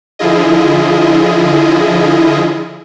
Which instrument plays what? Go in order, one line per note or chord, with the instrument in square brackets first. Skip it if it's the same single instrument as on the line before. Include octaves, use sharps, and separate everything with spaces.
[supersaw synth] D3 F3 E4 F4 G#4 D#5